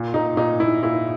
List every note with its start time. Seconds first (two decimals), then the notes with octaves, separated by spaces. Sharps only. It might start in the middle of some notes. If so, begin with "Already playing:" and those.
Already playing: A#2
0.14 A#2 D#4
0.37 A#2 D#4
0.60 A#2 E4
0.83 A#2 E4